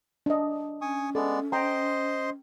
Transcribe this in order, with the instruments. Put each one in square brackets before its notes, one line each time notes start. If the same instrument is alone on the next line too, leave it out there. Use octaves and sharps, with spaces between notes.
[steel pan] D4 D#5
[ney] C#4 [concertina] G#5 C#6 D#6
[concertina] G#3 B3 D5 [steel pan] A4
[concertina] C5 D#5 C6 [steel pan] G5 A#5